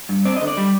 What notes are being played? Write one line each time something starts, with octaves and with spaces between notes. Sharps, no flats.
G2
C4 D5
D3 D#5
D5
G3